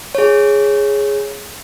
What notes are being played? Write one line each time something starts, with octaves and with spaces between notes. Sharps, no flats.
G#4 C#5